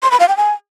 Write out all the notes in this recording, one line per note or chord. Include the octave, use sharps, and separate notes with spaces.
C6
B5
F5
G5
G#5